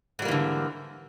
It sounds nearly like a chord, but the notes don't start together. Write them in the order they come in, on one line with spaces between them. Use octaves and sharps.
G#2 G3 A#3 E3 D3